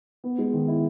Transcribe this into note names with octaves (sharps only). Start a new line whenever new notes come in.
B3
G#3
D#3
E4